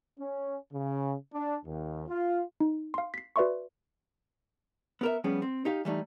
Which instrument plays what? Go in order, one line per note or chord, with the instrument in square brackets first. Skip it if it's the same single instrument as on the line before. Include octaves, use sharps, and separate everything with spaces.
[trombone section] C#4
C#3
D4
D#2
F4
[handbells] D#4
F5 C6
B6 C7
F#4 B4 D5 E5 C6 C#6
[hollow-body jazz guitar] B3 A#4 E5
F3 G3 B3 C#4 G#4
C4
D#4 G4 F5
E3 G3 A3 D#4